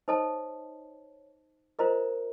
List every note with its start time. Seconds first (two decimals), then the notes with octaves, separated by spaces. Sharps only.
0.08 D#4 A4 C5 C#5 D#5 A5
1.79 F4 A#4 C5 D#5 A#5